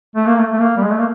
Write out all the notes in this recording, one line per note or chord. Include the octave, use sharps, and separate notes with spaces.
A3
A#3
A3
A3
A#3
G3
G#3
A3
A#3